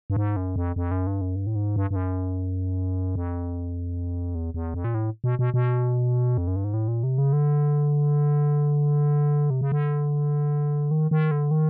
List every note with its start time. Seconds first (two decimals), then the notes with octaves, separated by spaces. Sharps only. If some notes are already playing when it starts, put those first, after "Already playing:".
0.10 G2
0.17 G#2
0.36 F#2
0.56 F2
0.76 F2
0.91 F#2
1.07 G2
1.21 F#2
1.36 G2
1.47 A2
1.56 G#2
1.76 G2
1.91 G2
1.96 F#2
3.16 F2
4.35 E2
4.54 E2
4.74 F2
4.84 A#2
4.94 A2
5.24 B2
5.39 B2
5.54 B2
6.38 F2
6.47 F#2
6.56 G2
6.64 G#2
6.74 A2
6.88 A#2
7.03 C3
7.18 C#3
7.33 D3
9.50 C3
9.61 C#3
9.72 D3
10.91 D#3
11.11 D#3
11.31 D3
11.51 D#3